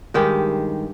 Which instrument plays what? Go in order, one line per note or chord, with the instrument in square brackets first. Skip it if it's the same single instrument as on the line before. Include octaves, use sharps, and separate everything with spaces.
[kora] G2 D#3 G#3 G4